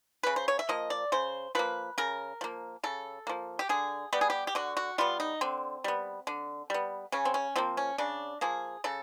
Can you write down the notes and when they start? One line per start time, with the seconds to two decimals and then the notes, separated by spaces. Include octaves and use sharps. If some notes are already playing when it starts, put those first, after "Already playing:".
0.23 C#3 B4
0.36 C5
0.48 C#5
0.59 E5
0.69 F3 A#3 D#5
0.90 D5
1.12 C#3 C5
1.55 F3 A#3 B4
1.98 C#3 A#4
2.41 F3 A#3
2.83 C#3 A4
3.27 F3 A#3
3.59 G4
3.69 D3 G#4
4.13 G3 B3 G4
4.21 G#4
4.30 G4
4.47 G4
4.55 D3 F#4
4.77 F#4
4.98 G3 B3 F4
5.20 D#4
5.41 D3 C4
5.84 G3 B3
6.27 D3
6.70 G3 B3
7.12 C#3 C#4
7.25 C4
7.34 C#4
7.56 F3 A#3 C4
7.77 C#4
7.98 C#3 D4
8.41 F3 A#3 G#4
8.84 C#3 A4